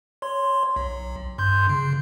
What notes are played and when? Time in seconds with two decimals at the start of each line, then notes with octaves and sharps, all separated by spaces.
0.22 C#5 C6
0.76 B1
1.38 G2 C6 G6
1.69 C#3